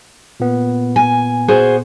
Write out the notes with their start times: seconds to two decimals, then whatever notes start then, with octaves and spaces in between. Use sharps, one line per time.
0.40 A#2 B3
0.96 G#5
1.48 F#4 G#4 C5